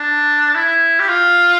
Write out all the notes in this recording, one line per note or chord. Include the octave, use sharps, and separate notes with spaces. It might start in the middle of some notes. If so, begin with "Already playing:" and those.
Already playing: D4
E4
G4
F4